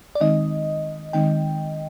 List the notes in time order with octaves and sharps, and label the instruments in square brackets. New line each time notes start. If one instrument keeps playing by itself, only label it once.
[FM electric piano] D5
[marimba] D#3 G#3 C4 D#4 [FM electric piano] D#5
[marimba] D#3 G#3 C4 D#4 [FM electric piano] G5